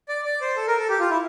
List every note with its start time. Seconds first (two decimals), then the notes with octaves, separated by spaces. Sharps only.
0.09 D5
0.25 D5
0.41 C5
0.57 A4
0.68 A#4
0.78 A4
0.89 G4
1.00 F4
1.10 E4